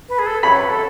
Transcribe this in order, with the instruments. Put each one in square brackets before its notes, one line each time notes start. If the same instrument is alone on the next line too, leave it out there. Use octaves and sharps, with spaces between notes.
[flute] B4
G#4
A4
[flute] C#5 [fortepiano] B5
[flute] B4
A4